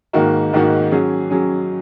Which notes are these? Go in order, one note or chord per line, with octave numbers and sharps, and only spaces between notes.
G#2 D#3 A#3 D#4 F#4
G#2 D#3 A#3 D#4 F#4
F#3 C#4 G#4
F#3 C#4 G#4